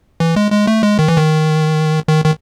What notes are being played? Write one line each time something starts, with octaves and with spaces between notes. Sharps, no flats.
E3
G#3
G#3
A3
G#3
D#3
E3
D#3
D#3
D#3